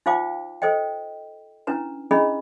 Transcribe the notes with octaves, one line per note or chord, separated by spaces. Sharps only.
D#4 F4 C5 F5 G5 D6
A4 C5 D#5 G5
C#4 D4 E4 B4 A#5
C#4 D4 E4 G#4 D#5 B5